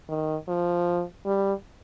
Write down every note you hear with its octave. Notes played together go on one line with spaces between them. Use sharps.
D#3
F3
G3